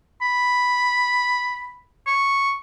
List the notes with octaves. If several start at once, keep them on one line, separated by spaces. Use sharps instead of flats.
B5
C#6